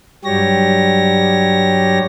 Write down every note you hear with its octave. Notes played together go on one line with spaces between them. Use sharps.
G2 F#3 G3 G4 C#5 A#6